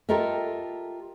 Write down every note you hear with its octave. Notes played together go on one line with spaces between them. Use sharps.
F4 G4 A4 A#4 D#5 E5